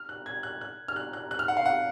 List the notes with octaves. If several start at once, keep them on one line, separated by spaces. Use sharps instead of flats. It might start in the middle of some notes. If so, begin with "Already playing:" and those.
Already playing: F6
F#6
G#6
F#6
F#6
F6
F#6
F#6
F#6
F6
F#5
F5
F#5